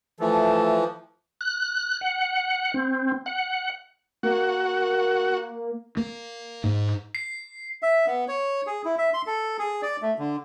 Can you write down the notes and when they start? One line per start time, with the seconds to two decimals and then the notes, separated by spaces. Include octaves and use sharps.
0.20 E3 F3 A3 A4
1.41 F#6
2.01 F#5
2.74 C4
3.26 F#5
4.23 A#3 F#4
5.97 A#3
6.64 G#2
7.15 C7
7.83 E5
8.06 B3
8.28 C#5
8.67 G#4
8.85 E4
8.98 E5
9.14 C6
9.27 A4
9.59 G#4
9.82 D5
10.02 A3
10.18 D3